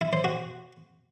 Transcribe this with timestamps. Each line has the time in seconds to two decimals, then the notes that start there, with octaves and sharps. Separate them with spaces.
0.01 E4
0.13 C5
0.24 F#4